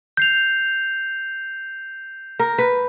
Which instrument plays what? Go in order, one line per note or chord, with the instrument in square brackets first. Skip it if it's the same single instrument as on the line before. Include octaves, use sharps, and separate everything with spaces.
[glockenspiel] G6 C7 F7
[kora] A#4
B4